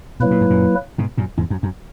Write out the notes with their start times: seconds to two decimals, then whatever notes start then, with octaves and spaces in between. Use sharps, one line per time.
0.20 B2 F#3 A#3 E4 B4
0.31 A#2
0.41 G#2
0.50 F#2 A#2
0.98 G#2 B2
1.18 F#2 A#2
1.37 E2 G#2
1.50 F#2
1.63 F#2